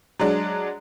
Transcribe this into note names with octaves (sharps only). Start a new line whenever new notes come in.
F#3 G#3 D4